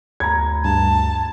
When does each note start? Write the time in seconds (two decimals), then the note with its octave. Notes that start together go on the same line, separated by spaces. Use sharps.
0.20 D2 A#5 B5 G#6
0.65 G2 A5